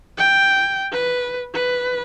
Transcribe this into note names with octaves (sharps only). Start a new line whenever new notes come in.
G5
B4
B4